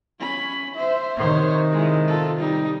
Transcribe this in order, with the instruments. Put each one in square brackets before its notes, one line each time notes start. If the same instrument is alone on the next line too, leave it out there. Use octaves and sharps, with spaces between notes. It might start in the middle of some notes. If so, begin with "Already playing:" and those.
[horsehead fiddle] C#4 B5
C5 E5
[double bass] C3 D#3 [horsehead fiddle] C5 C#5
[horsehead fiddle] G#3 E4
F4 A4
G3 D#4